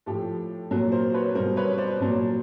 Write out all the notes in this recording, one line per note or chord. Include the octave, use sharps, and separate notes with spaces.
A2 F3 G4 A4
A#2 F#3
A#4 C5
B4 C#5
B2 G3 A#4 C5
B4 C#5
C5 D5
A#2 F#3